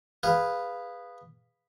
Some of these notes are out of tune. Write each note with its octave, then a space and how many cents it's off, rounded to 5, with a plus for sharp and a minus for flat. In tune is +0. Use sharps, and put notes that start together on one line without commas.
G#4 -15 B4 +0 F5 +0